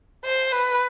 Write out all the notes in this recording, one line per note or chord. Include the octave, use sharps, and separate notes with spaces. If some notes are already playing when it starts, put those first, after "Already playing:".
C5
B4